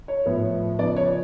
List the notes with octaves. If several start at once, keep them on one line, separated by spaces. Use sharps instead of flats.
C#5
A2 F3 B3
C#3 F3 B3 D5
C#5